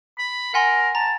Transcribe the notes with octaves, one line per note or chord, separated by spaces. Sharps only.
B5
A#4 F#5 G#5 C6
A5 A#5